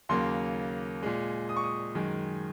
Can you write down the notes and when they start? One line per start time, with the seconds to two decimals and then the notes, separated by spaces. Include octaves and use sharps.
0.09 D#2 C#3 F#3 A#3 C6
1.03 A#2 G#3
1.49 D#6
1.56 C#6
1.64 D#6
1.95 F#2 D#3 G#3